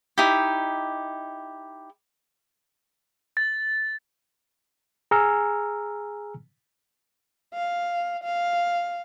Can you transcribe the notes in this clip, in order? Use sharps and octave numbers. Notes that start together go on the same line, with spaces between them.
D#4 E4 G4
A6
G#4 G#5 A#5 E6 F6
F5
F5